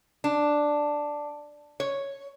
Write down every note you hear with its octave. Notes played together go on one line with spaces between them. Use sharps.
D4
C#5